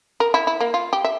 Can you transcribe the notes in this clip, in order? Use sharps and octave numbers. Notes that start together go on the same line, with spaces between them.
A#4
E4
E4
A#3
F4
G4
E5